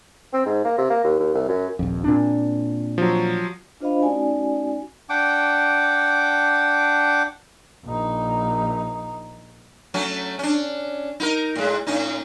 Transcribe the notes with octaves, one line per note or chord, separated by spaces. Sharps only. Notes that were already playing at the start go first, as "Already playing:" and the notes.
C4
G#2
A#3
C3
A#3
D#2
D#2
C2
F#2
D#1 A#1 F2
A#2 C4 D4
F3 F#3
D4 F4 C5 D#5 F5 B5
A3 C#4 D#4 F#4 D5 G#5
D4 F#5 G5 D6
A#1 D#4
F#3 A3 C#4
C#4 D4
D#4 E4 A#4
A2 G#3
A2 C#4 D#4